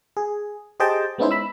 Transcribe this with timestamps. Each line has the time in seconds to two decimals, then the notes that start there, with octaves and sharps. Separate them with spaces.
0.17 G#4
0.80 G4 G#4 C5 D#5 G5 A5
1.18 G#3 B3 C#4 D#4 E4 C5
1.31 B5 E6